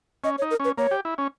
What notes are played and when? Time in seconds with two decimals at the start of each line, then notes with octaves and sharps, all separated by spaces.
0.24 C#4 D#5
0.38 C#5
0.42 D#4
0.51 A#4
0.60 C#4 B4
0.78 A#3 C#5
0.91 G4
1.05 E4
1.18 C#4